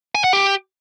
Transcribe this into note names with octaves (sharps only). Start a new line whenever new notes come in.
G#5
F#5
G4